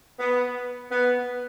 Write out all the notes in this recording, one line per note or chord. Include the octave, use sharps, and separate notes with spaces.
B3
B3